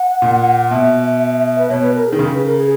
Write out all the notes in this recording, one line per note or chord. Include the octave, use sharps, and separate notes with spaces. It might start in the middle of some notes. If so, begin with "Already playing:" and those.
Already playing: F#5
A#2
B2 E5
B4
B2 C#5
B4
A#4
G#4
D#3
C#3
B4
A#4
G#4